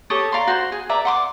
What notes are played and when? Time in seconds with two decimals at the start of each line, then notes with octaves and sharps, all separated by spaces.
0.10 G4 A4 C#5 D#6
0.32 D5 F5 A#5 C6
0.47 F#4 C5 C6
0.72 G#4
0.89 B4 D5 E5 A#5
1.05 F#5 C6 D6